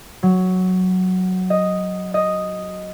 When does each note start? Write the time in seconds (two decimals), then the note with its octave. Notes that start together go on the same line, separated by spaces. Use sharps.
0.23 F#3
1.50 D#5
2.14 D#5